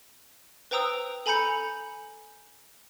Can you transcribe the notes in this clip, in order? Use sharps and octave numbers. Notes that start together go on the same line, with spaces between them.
B4 C5 G5 A#5 D#6 E6
A4 G#5 A#5 B5 G6 C#7